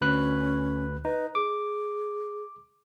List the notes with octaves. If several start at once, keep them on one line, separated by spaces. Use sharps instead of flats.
D2 C#4 B4 F#6
D#4 B4
G#4 D6